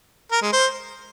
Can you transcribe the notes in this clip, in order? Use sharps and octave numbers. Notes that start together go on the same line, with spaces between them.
A#4
G#3
C5